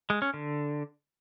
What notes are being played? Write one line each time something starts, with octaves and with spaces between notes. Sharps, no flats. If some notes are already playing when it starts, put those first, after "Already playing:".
G#3
C#4
D3